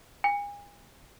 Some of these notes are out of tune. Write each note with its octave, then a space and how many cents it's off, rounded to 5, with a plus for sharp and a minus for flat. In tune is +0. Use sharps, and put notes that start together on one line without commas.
G#5 -35